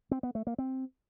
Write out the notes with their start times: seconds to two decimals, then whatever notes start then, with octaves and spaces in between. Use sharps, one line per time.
0.11 C4
0.23 B3
0.35 A3
0.47 A#3
0.58 C4